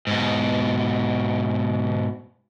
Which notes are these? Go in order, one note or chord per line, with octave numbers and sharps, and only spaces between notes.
G#2 B2